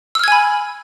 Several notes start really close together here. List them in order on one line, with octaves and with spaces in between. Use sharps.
E6 F6 G#6 G#5 B5